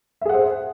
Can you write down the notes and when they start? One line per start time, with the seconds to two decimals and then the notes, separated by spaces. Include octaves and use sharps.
0.21 E5
0.25 G#4
0.29 F#5
0.33 C5